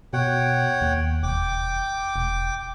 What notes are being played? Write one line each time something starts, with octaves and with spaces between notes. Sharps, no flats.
B2 C#5 F#5 G5
D#2
E1 G5 D6
E1